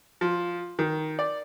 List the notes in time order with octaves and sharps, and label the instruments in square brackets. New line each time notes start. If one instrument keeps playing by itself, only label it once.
[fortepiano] F3
D#3
D5